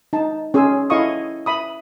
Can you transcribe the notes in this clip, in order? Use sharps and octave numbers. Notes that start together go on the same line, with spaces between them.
D#4 A5
C#4 G#4 G#5 C6 E6
E4 A4 D#5 F5 C#6 D#6
E5 B5 D#6